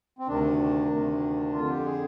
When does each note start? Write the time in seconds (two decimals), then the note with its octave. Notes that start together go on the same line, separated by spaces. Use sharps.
0.19 C4
0.28 D2 C3 D#3 D4
0.90 D2 C3 D#3
1.53 F2 D3 F4
1.69 G4
1.85 G#4